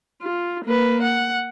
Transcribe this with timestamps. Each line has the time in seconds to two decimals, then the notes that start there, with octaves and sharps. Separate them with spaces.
0.22 F4
0.65 A#3 B4
1.02 F#5